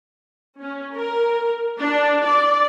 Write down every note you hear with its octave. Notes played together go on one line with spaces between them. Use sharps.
C#4
A#4
D4
D5